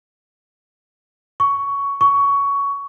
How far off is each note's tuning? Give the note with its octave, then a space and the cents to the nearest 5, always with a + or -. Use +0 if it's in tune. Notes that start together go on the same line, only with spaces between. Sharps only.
C#6 +10
C#6 +15